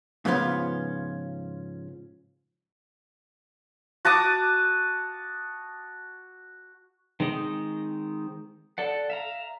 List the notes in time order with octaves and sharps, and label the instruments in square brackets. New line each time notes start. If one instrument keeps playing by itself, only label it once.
[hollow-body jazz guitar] G#2 C#3 F3 B3 C#4 F4
[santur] F#4 A5 D6 D#6
[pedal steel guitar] D#3 G#3 C4 D#5
A4 D5 F#5
E5 F5 A#5